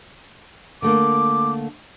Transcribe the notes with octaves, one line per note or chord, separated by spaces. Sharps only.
D3 A3 A#3 D6